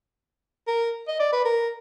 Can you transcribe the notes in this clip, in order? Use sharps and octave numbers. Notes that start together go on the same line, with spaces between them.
A#4
D#5
D5
B4
A#4